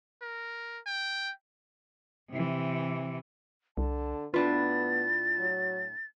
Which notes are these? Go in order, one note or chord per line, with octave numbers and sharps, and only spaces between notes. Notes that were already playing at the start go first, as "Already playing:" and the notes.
A#4
G5
C3 E3
C2 D3 A5
A2 B3 D4 F4 B4 A6
F#3